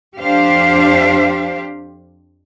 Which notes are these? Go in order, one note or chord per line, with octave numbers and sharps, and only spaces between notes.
F2 D4 G4 C5 F5